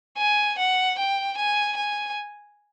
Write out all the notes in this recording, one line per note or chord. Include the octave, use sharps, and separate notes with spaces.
G#5
F#5
G5
G#5
G#5